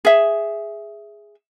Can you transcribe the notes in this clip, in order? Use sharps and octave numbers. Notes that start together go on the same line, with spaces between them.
G#4 E5